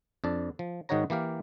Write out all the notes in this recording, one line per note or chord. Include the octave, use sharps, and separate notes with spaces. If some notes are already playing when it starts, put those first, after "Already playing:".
F2 D4 A5
F3
G#2 D#3 D#4 F#4 C#5 A#5
E3 A#3 G4 F5